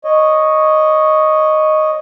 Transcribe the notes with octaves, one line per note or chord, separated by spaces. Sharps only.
C#5 D#5